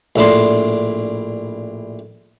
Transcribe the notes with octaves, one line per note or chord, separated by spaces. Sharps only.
A#1 A2 D4 C6